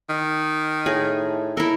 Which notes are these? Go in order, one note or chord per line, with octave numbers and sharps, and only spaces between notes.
D#3
A2 D#4 G#4
E4 A4 A#4